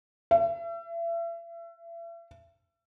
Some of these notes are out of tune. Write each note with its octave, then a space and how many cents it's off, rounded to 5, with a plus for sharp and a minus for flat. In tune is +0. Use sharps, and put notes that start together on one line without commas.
E5 +35